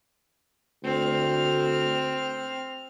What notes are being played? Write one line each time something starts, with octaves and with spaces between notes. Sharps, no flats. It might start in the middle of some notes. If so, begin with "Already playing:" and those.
D2 C4 F6